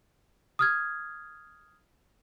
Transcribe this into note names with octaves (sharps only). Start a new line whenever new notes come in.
D#6 F6 G#6